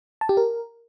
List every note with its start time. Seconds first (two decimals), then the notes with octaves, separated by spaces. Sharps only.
0.21 A5
0.29 G4
0.37 A#4